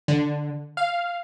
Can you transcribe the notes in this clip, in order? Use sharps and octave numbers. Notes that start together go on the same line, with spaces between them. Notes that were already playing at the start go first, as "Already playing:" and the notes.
D3
F5